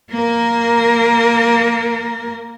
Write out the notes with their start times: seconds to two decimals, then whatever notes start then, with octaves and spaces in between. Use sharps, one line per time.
0.12 A#3 A#4